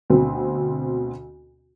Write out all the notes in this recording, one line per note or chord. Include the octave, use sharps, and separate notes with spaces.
D2 B2 C4